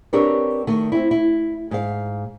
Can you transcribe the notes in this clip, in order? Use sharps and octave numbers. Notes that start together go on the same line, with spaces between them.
C4 D4 G4 A#4 B4 C#5
D#3 A3
C4 E4
E4
G#2 F5